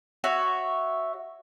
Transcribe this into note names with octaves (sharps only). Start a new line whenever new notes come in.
F#4 C#5 E5